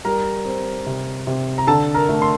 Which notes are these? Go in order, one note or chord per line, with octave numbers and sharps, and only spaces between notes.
G3 A#4 A#5
C4
C3
C3
A#5
D3 A4 A5
A#4 A#5
A3
C6